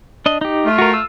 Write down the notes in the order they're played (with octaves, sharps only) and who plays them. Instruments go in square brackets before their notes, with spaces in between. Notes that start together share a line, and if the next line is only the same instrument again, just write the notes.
[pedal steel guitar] D4 D#5
D#4 G4
[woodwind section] A3 F4
[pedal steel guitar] F#4 A#4
E6